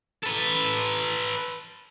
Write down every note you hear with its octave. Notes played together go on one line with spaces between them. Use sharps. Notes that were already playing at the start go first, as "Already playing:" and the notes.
A4 B4